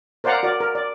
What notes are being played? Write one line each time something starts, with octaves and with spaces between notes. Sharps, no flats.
A#4 C5 D5 F5 F#5 A#5
F#4 A#4 D5
A#4
D5